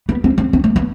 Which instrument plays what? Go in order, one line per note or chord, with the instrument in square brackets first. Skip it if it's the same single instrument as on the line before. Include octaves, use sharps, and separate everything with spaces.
[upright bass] B3
C4
C4
C4
A3
B3